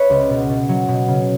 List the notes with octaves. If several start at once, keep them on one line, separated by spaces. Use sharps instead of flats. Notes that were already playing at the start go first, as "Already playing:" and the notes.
Already playing: B4 C#5 E5
C#2
B2
B2
F#3
B2
C#3